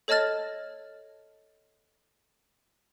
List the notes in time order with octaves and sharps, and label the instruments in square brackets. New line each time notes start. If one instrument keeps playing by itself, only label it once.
[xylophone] A4 C#5 D#5 A5 F6 A6